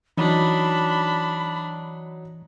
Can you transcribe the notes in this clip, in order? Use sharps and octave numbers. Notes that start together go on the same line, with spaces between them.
E3 F#3 D4 D#4 B5